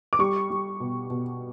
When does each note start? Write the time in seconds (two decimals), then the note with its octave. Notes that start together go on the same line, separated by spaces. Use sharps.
0.13 D6
0.19 G3 C#6
0.50 G3
0.80 B2
1.10 B2